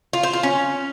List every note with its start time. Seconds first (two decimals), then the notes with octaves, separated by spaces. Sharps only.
0.13 F4
0.23 C5
0.33 F4
0.43 C#4